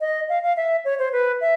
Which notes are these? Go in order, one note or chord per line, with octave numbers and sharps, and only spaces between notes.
D#5
F5
F5
E5
C#5
C5
B4
E5